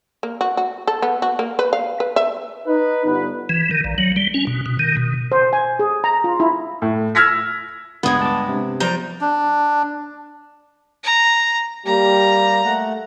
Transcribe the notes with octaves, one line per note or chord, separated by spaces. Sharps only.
A#3
F#4
F#4
A4
B3
F#4
A#3
B4
F5
B4
E5
D#4 B4
G1 B3 B4
E3
D#3
A#1
F#3
G3
C#4
B2
B2
D#3
B2
C5
G#5
G#4
A#5
F4
E4
A2
E6 F6 G#6 A#6 B6
C#2 G2 G#3 B3 D#6 G#6
A5 D6
C3
F3 D5 A#5 G6
D4
A#5
G3 A#3 G4 A#5
A3 F#5